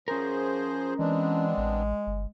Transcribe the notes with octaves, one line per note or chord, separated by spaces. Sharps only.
F3 C#4 G#4 A#4 C5
E3 G#3 B3 C4 D4
A1
G1